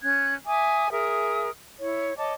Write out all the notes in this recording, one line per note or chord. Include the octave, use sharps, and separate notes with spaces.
C#4 F#6 G#6
E5 G#5 D6 D#6
G#4 A#4 E5 D#6
E4 C#5
C#5 D#5 A5 D6